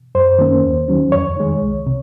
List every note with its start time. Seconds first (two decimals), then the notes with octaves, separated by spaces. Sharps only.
0.15 F#2 C5
0.39 D#3 A#3 C#4
0.64 D#2
0.88 D#3 F#3 C#4
1.12 F2 C#5
1.37 D#3 G#3
1.62 C2
1.87 C3